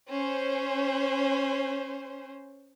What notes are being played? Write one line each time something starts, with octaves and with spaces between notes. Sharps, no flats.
C#4 C5